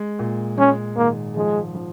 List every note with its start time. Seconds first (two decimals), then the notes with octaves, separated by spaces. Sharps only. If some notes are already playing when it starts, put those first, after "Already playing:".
Already playing: G#3
0.19 A#2
0.58 G#3 C#4
0.97 G#1 A#3
1.36 F3 G#3
1.75 F3